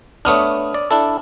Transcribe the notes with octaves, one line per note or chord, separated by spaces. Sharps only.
A3 B3 D4 C#5 D#6 F6
D5
D4 E4 A4